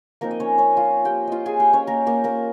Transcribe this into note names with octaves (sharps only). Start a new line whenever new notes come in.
F3 A#3 C4 D#4 A#4
D#5
C#4 C#5
C#4 C#5
F4 F5
G4 G5
F4 D#5 F5
G#4 G#5
G4 G5
C#4 C#5
A#3 A#4
A#3 A#4
A#3 A#4